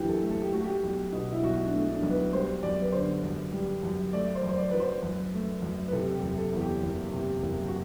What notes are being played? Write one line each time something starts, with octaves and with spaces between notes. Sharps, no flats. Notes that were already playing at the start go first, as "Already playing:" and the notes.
Already playing: F#1 F#2 E3 D4 F#4 G4
A4
A3
A4
G4
A3 F#4
G4
B1
B2
E4
B1 F#4
D4
A3
D4
B1
B4
G3 C5
F#2 D5
B4
D3 C5
F#2
G3
F#2
A3 D5
C5
F#2
C5
D5
F#3 B4
C5
F#2
A3
F#2
B4
C3 A4
G4
F#1
A4
E2
G4
F#1
C3
F#1
F#4